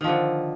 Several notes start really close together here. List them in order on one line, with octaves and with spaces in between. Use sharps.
D#3 F3 D3